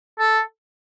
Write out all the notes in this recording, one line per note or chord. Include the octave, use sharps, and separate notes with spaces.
A4